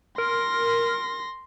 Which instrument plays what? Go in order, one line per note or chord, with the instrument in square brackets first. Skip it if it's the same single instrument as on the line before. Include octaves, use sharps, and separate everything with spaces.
[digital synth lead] A#4 [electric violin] C6 A#6